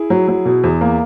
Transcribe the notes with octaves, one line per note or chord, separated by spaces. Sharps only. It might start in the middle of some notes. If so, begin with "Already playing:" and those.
Already playing: E4 G#4
F#3
F#3
B2
E2
A#3